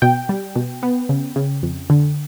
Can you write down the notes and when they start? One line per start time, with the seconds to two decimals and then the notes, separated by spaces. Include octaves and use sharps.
0.02 B2 G5
0.29 G3
0.56 B2
0.83 B3
1.09 C#3
1.36 C#3
1.63 F2
1.90 D3